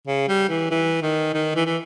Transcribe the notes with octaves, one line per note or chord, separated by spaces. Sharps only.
C#3
G3
E3
E3
D#3
D#3
E3
E3